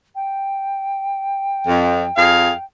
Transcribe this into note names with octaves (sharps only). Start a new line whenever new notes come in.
G5
F2
F2 G#4 F5